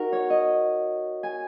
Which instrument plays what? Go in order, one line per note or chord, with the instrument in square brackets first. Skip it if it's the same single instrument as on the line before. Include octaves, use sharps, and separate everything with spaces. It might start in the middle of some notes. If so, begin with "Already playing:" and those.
Already playing: [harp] D#4 F#4 A#4
C#5
D#5
G#5